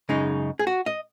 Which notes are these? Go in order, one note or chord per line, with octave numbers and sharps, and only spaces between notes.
F#2 C#3 G#3 D#4
G#4
F#4
D#5